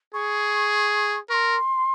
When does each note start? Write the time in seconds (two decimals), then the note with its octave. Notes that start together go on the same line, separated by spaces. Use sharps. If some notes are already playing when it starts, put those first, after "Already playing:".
0.13 G#4 C#6
1.30 A#4 C6 C#6